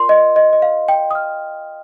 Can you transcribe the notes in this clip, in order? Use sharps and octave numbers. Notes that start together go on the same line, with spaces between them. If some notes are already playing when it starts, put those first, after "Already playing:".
Already playing: F4 A#4 D5 C6
D#5
D#5
D#5
F5
G5
D#6
F6